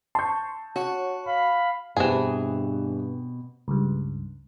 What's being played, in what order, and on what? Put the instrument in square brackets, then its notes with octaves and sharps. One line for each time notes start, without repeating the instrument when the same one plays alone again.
[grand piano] A5 G6 [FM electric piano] C6 C#6
[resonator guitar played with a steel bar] F#4 [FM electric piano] C#5 F#5
[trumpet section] F5 B5
[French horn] G2 [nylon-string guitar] B2 C4 G4 [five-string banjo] E3 G#4 [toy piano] C5 A5
[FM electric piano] C#2 G2